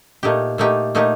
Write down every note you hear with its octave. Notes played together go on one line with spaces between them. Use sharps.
A#2 A3 D#4 G4
A#2 A3 D#4 G4
A#2 A3 D#4 G4